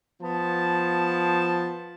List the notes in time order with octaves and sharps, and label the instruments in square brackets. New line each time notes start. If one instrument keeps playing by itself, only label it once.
[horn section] F3 B3 A5